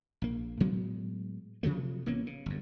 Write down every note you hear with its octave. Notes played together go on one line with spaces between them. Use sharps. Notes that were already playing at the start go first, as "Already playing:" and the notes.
A#1 A#3
A2 F#3 G#3 B3
C3 F3 F#3 A3
A1 A#3 B3 C#4
C#3
G1 F#2